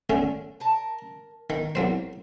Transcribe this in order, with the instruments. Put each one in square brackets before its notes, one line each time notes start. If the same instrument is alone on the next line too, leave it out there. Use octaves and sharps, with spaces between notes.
[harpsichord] D3 A3 C#4
[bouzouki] A#4 A5
[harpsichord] D#3 [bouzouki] A#4
[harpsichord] C2 F#3 C5